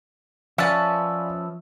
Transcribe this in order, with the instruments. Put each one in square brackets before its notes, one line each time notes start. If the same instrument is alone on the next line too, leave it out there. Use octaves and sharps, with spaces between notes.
[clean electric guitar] F3 E5 [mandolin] C#4 B4 A5 [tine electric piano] D5 F5 G#5